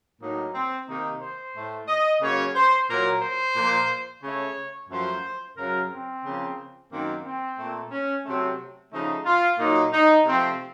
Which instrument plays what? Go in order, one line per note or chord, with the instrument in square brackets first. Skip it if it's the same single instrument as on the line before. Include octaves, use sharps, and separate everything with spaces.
[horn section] A2 F#3 A#3 D#4
C4
C3 D#3 A#3 D#4
C5
A2 A3
D#5
C#3 F#3 A#3 C#5
C5
A#2 F#3 A#3 A#4
C5
A#2 F3 A#3
C#3 A3 C#5
F#2 F3 A3 C5
F#2 C#3 F#3 A#4
C4
C#3 F3 A#3
F#2 D#3 A#3 C4
C4
A#2 A3
C#4
C3 F#3 A3 C4
C#3 F3 A3 D#4
F4
A#2 F#3 A#3 D#4
D#4
C3 F3 A3 C4